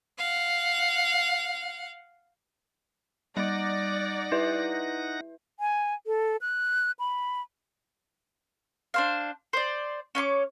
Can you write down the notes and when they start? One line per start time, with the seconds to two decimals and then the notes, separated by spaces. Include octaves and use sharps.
0.18 F5 F#5
3.37 G3 D#4 D5 F#5 A#6
4.32 E4 B4 E5
5.60 G#5
6.07 A4
6.41 F#6
6.99 B5
8.94 D4 C5 F5
9.53 C5 D5
10.15 C#4 C#5 C6 D6